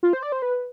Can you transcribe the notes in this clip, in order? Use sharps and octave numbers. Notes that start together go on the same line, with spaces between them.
F4
C5
D5
C5
B4